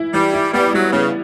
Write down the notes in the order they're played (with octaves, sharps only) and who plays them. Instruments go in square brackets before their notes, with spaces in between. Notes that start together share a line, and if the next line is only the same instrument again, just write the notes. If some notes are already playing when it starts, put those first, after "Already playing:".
Already playing: [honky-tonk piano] E3 E4
[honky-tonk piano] E3 [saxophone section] G3
[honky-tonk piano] E4
[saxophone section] G3 [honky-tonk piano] B3
[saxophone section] F#3 [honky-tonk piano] G3
[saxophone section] C#3 [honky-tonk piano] B3